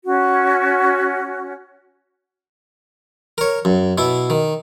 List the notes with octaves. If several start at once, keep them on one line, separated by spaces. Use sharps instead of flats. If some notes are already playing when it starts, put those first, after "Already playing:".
C#4 F#4
A#4 C#5
F#2
B2 E4
D#3